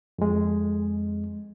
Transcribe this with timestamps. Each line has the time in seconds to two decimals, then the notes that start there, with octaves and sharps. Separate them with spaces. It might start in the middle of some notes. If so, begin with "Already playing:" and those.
0.19 F2 G#3